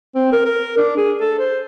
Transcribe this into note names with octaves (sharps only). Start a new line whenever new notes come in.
C4
A#4
A#4
D4
G#4
A4
C5